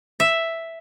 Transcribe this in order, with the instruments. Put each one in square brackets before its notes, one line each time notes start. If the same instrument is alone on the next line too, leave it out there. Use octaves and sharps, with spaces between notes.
[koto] E5